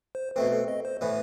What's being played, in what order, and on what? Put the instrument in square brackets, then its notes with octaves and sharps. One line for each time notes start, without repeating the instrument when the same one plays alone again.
[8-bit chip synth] C5
[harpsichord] B2 A3 C4 [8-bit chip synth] B4
[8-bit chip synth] A4
D#5
C5
[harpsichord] A2 E3 B3 [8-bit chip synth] B4